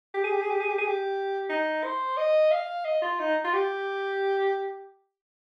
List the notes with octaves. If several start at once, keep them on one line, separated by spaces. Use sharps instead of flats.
G4
G#4
G4
G#4
G4
G#4
G4
G#4
G4
D#4
C5
D#5
F5
D#5
F4
D#4
F4
G4